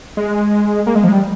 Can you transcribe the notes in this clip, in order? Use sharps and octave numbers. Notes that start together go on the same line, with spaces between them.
G#3
A#3
G#3
F3
G#3
G3